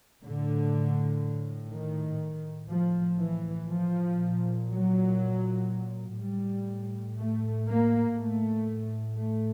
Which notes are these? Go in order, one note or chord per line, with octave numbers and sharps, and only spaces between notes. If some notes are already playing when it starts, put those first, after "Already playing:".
A2 D3
D#3
A2
F3
E3
F3
A#2
F#3
A2 G3
A3
A#3
A2 A3
A3